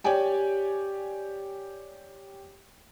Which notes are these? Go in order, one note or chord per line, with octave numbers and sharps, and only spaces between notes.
G4 C#5 D5 G5 G#5